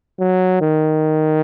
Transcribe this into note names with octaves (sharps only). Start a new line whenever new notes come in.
F#3
D#3